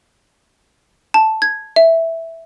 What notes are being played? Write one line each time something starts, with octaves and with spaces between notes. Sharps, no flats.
A5
G#6
E5